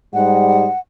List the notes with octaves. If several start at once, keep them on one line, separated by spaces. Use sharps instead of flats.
G#2 G3 F#5